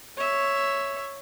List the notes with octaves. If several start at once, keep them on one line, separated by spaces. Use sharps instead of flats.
C#5 E5